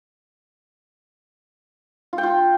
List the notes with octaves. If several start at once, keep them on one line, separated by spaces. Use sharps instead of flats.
F4
G5
F4